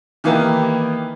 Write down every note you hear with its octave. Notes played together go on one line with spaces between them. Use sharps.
D#3 E3 A#3 B3 E4 G4